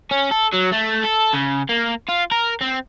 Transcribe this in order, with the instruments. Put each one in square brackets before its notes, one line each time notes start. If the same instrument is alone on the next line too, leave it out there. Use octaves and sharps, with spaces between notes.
[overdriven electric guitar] C#4
A4
F#3
A3
A4
C#3
A#3
F4
A#4
C4